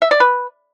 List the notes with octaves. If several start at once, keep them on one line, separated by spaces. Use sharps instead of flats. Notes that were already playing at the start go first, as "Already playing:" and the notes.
E5
D5
B4